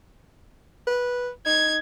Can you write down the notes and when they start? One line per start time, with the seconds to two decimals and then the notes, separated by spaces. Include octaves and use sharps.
0.87 B4
1.46 D#4 G#6